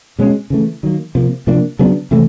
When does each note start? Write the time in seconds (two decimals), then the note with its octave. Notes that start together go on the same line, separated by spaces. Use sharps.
0.19 B2 G#3 C#4
0.50 C#3 E3 A3
0.83 D#3 F#3 A#3
1.15 C3 F3 A#3
1.47 C3 F3 A#3 D4
1.79 C#3 F#3 B3 D4
2.11 C3 E3 A3